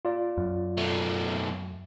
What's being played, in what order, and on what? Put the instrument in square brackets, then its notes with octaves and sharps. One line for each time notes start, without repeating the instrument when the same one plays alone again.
[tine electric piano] F4 D5
[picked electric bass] F#2
[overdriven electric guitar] B2 A3